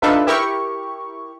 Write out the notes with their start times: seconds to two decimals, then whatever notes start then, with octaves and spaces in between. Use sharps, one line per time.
0.02 D4 D#4 F4 A4 B4 E5
0.26 E4 G4 A#4 C#6